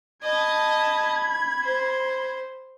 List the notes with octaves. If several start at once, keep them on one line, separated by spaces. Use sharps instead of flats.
D#5 A5 B5 G#6
C5